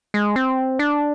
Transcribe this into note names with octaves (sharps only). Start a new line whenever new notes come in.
G#3
C4
D4